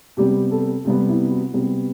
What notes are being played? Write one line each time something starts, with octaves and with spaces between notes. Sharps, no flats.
C3 G3 B3 G4
A4
C3 G3 B3
E4
F#4
C3 G3 B3